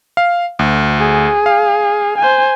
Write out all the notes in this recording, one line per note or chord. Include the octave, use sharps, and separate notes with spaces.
F5
D2
G#4
F5
C5 G#5